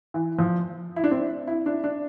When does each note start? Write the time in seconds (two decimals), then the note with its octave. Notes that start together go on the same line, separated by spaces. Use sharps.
0.14 E3
0.39 F3
0.96 E4
1.04 D4
1.11 C4
1.47 E4
1.66 D4
1.84 D4